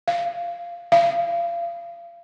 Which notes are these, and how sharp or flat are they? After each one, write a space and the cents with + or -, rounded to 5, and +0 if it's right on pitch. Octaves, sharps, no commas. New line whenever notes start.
F5 -10
F5 -35